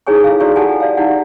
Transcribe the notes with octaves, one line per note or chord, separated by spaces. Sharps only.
D#4 E4 G#4 C#5 G#5 C#6
E4 A4 F5
E4 F#4 D5 C6 C#6
G4 A4 F#5 G#5 A5
D5 F5
D#4 E4 G4 D5 F#5